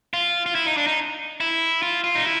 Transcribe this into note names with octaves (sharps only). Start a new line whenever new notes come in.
F4
F4
E4
D#4
D4
D#4
E4
F4
F4
D#4
E4